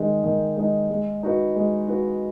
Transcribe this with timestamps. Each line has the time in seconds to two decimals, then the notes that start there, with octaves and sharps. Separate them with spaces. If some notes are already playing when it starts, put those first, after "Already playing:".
Already playing: D#3 G#3 D#4
0.24 D#3
0.57 G#3 D#4
0.90 G#3
1.23 D#4 F#4 B4
1.56 G#3
1.88 D#4 F#4 B4